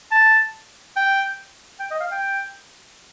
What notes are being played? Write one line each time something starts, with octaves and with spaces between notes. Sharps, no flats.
A5
G5
G5
D#5
F5
G5